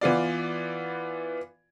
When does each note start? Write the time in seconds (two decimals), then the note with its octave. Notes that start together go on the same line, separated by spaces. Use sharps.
0.01 E3 B3 F4 D5